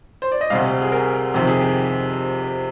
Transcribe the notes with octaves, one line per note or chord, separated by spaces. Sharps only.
C5
D5
D#5
D2 C3 G3 F5
G#4
A#4
F2 C3 D#3 G4
G#4
G4